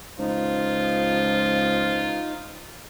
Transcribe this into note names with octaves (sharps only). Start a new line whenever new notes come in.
C#2 F3 D#4 F4